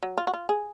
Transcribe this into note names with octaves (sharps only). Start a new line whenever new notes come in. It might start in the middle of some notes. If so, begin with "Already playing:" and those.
F#3
F4
F#4
F4
G#4